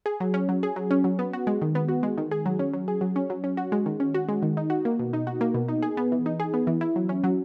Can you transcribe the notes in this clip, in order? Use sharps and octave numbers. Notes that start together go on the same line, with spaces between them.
G#4
F#3
C#4
F#3
G#4
F#3
C#4
F#3
B3
F#4
G#3
D#3
B3
F#4
G#3
D#3
G#4
F#3
C#4
F#3
G#4
F#3
C#4
F#3
C#4
F#4
G#3
D#3
C#4
F#4
G#3
D#3
D#4
F#4
A#3
B2
D#4
F#4
A#3
B2
D#4
G#4
B3
E3
D#4
G#4
B3
E3
E4
F#3
C#4
F#3